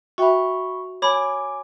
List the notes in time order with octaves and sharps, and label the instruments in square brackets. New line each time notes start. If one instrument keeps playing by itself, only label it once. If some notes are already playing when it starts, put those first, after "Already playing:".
[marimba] F#4 E5 G5 [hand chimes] B5 C#6
[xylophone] C#5 B5 [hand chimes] G#5 D6